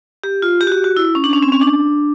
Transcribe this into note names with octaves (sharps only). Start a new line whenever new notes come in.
G4
F4
G4
F#4
G4
F#4
E4
C#4
D4
C#4
C4
C#4
D4